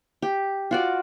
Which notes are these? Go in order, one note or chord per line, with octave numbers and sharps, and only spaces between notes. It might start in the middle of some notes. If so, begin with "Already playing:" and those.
G4
F4 F#4 D5